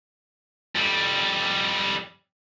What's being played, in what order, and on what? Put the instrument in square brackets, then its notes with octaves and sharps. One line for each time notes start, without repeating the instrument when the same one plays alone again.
[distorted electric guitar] F2 G3